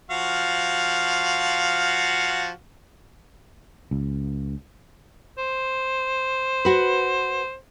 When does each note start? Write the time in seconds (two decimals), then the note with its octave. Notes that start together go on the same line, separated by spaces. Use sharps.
0.11 F3 F#4 F5
3.91 C#2
5.38 C5
6.65 F#4 B4